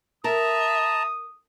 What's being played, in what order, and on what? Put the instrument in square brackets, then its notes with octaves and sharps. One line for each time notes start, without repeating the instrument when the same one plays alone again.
[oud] A#4 [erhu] E5 [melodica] A5 A#5 [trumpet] D#6